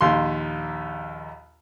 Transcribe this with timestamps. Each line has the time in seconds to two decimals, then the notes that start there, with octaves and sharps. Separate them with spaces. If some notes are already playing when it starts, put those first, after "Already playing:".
0.01 A#1 D#2 C6